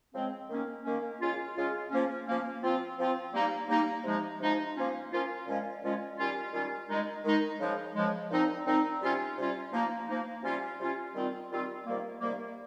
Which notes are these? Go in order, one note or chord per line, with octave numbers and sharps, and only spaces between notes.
C#3 F3 G#3 C4
D#3 A#3 C#4
D#3 A#3 C#4
C#3 G#3 C#4 F4
C#3 G#3 C#4 F4
F3 A#3 C#4
F3 A#3 C#4
F3 C4 F4
F3 C4 F4
G3 A#3 D#4
G3 A#3 D#4
C3 F3 G#3 D#4
C3 F3 G#3 D#4
F3 A#3 C#4 F4
F3 A#3 C#4 F4
A#2 F3 G#3 C#4 F4
A#2 F3 G#3 C#4 F4
D#3 G3 C#4 F4
D#3 G3 C#4 F4
D#3 G#3 D#4
D#3 G#3 D#4
C#3 F3 G#3
C#3 F3 G#3
A#2 F3 C4 D#4
A#2 F3 C4 D#4
C3 G3 C#4 F4
C3 G3 C#4 F4
F3 A#3 D#4
F3 A#3 D#4
C3 G3 C#4 F4
C3 G3 C#4 F4
D#3 G3 C4 F4
D#3 G3 C4 F4
C3 D#3 G3 A#3
C3 D#3 G3 A#3